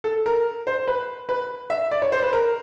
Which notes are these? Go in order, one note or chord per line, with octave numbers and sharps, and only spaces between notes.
A4
A#4
C5
B4
B4
E5
D5
C#5
C5
B4
A#4